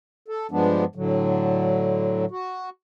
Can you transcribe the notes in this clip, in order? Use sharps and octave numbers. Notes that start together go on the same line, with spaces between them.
A4
G2 F3 G#3 B3 D4
A2 D3 F#3
F#4